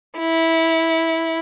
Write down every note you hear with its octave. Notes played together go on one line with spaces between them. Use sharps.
E4